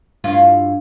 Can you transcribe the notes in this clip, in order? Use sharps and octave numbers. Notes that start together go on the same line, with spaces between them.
G2 E4 F4